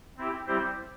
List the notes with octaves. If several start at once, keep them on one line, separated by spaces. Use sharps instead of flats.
C4 E4 G4
G3 C4 E4 G4 C5